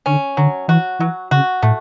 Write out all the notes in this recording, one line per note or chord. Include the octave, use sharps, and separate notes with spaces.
D3 C#4
D3 F#3
E3 F#4
E3 F#3
C#3 F#4
A2 A3